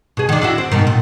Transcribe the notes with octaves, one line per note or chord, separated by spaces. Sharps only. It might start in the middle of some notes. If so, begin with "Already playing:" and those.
B2 G#4
D#3 D4
D4 E4 F#4
C4
G#2 B2 D#3
A#2